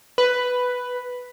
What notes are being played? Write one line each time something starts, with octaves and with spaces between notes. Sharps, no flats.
B4